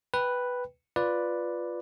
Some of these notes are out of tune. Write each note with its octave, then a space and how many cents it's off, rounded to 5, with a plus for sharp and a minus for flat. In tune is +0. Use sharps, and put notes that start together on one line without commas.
B4 +0 G5 +0
F4 +0 B4 +0 D5 +0